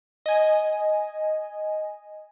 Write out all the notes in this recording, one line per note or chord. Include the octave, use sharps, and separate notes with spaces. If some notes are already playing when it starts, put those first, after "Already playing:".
D#5 G#5